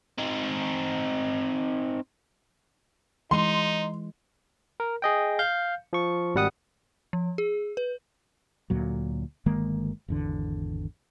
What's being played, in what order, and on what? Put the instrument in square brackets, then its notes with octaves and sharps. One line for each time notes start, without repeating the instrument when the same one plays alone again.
[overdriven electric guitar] C4 D#4
[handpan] E3 G#3 [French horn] D#4 [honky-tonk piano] C6
[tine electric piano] A#4
G#4 D#5 G5
F5 G6
F3 C#6
G#1 G3 F#5 D#6
[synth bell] F3
G#4
B4
[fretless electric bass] D2 A#2 F#3
G1 D#3 G#3 A#3
G#1 E2 D3